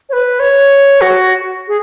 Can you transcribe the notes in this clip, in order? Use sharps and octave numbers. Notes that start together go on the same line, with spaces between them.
C#5
B4
C#5
F#4
G#4